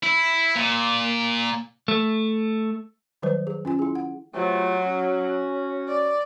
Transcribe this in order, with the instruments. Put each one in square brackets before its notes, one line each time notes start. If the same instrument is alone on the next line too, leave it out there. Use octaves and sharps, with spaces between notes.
[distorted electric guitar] E4
A#2
[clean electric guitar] A3
[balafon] D#3 F#3 G3 B4 C5
G#4
C#4 F4 G#5
E4 G#4
F#5
[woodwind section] C3 A3 F4 [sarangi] F#3
[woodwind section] C#4 F#4
[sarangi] D5